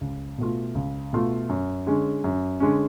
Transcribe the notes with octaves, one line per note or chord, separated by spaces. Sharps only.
C#2
B2 A3 F4
C#2
B2 A3 F4
F#2
D3 G#3 C#4
F#2
D3 G#3 C#4